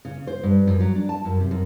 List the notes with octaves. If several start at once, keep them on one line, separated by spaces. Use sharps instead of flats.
C#3
C5
G2
F#2
F#3
D4
A5
F#2
C3
F#2